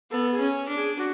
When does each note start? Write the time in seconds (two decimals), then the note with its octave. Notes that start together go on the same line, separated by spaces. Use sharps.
0.11 B3 A4
0.32 G#4
0.40 C#4
0.69 D4
0.76 G#4
0.98 F#4